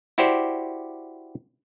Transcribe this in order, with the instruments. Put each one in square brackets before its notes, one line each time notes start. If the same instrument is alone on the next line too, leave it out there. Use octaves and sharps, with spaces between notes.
[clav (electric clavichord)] E4 F#4 G4 C5 D5